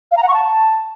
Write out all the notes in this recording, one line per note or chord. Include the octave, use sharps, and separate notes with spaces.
F5
A#5
F#5
C#6
A5